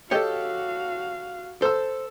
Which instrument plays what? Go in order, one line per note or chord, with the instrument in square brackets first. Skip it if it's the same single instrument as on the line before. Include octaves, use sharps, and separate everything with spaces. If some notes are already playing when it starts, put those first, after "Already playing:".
[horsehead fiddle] F#4 F5 [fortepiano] G4 A4 [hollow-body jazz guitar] C#5 D#5 G5
[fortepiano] A4 E6 [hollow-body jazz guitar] C5